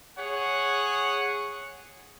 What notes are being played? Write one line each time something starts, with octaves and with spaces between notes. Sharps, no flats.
G#4 C#5 F#5